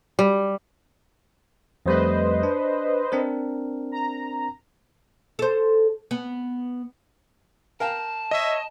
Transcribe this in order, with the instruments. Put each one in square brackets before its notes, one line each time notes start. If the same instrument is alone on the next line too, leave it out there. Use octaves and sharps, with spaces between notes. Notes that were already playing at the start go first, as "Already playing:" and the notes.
[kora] G3
[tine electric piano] F2 G3 A3 [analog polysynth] B4 C5 D#5
[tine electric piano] D4
C4 D4 A#4
[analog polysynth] A#5
[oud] A4 C5
B3
[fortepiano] A#4 F5 G5 [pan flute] A5
[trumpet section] C#5 E5 [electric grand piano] D#5